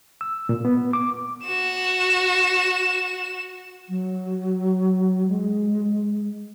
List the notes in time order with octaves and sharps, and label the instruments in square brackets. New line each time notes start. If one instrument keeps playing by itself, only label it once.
[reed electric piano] E6
A#2
B3
D6
[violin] F#4 E7
[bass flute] F#3
G#3